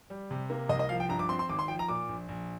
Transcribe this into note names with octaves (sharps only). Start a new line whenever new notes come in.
G3
C3
A#3
C2 D#5
D#5
F3 F5
G5
G2 A#5
D6
C4 C6
C6
G#1 D6
C6
F3 G5
A#5
A#2 D6
A#1
A#1